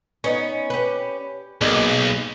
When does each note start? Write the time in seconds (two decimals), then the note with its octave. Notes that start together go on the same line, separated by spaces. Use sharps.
0.24 B3 C#4 D#4
0.70 G4 B4
1.61 B1 B2 G#3 A#3 D5